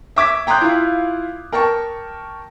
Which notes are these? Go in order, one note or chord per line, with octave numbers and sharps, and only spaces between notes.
E5 D6 G#6 B6
G5 A#5 C6 D#6 F#6 G6
E4 F4 F5
A#4 G5 A5 C#6